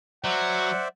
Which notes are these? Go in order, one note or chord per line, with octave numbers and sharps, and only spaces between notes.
F#3 C5 D5 E5 F#5